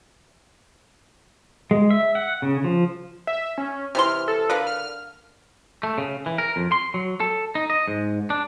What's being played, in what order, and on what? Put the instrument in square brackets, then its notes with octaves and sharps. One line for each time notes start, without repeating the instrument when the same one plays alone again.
[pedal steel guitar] G#3
E5
F#5
C#3
F3
[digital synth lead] E5
C#4
[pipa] C3 E3 C6 [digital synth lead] F6
[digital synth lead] A4
[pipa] D3 A#4 F5 [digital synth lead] B4
[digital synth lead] F6
[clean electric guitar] A3
C#3
E3
A#4
F2
C6
F#3
A4
D#4
D#5
G#2
D4